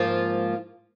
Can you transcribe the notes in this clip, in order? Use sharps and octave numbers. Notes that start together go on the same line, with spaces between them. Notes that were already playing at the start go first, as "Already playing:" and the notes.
Already playing: G#2 F3 A#3 F4